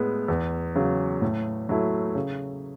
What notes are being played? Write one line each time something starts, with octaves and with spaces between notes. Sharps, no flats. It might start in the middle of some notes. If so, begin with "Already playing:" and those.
Already playing: A2 G#3 B3
E2
C#3 F#3
A2
F#3 A3 E4
C#3